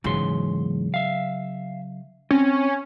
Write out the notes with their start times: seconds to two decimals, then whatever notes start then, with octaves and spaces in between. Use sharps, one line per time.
0.04 E2 G#2 C#3 F#3 C6
0.94 E5 F5
2.31 C4 C#4